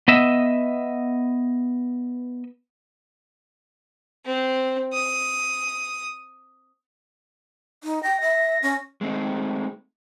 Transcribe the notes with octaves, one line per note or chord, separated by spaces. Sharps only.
B3 D#5 E5
C4
D#6
D#4
G5 A#6
E5
C#4
G#3 A3 C4 D#4